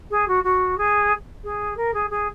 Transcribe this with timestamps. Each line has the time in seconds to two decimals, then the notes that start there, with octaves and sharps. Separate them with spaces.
0.10 G#4
0.27 F#4
0.43 F#4
0.77 G#4
1.43 G#4
1.76 A#4
1.93 G#4
2.10 G#4